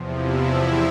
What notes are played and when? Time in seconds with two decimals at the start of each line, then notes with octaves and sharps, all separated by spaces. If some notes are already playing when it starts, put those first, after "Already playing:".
Already playing: E2 C3 F3
0.13 E4